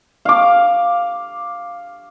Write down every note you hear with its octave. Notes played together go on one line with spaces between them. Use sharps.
F5 D6